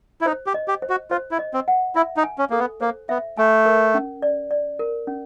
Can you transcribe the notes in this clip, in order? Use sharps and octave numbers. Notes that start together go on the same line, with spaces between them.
E4
D#4 C5
G4
D#5
G4
C5
F#4
F4 C5
E4
D#5
C4
F#5
E4 E5
D#4
G#5
C#4
A#3 A4
B3
A#3 C5
B3 E5
A3 G#5
A#4
C#4
D5
D5
A#4
C#4